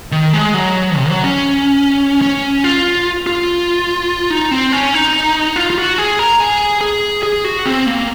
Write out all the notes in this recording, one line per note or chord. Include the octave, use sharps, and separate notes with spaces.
D#3
G#3
F#3
C3
F#3
C#4
C#4
F4
F4
D#4
C4
C#4
D#4
F4
F4
F#4
G#4
A#4
G#4
G#4
G#4
F#4
C4
A#3